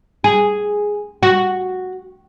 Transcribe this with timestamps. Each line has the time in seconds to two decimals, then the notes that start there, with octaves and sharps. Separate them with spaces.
0.24 G#4
1.23 F#4